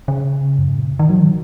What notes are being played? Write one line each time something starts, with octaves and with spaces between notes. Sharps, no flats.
C#3
F#2
G#2
A#2
C#3
D#3
F#3
D#3